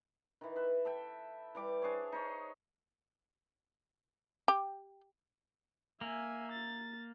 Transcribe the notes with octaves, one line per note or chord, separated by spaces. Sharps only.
D#3 E3
B4 E5
A4 E5 G5
E3 G3 D6
D4 G#4 C5 C#5
D#4 C5 C#5
G4
A#3 E5 G#5
A6